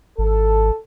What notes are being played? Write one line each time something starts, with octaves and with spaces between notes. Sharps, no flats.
G#1 A4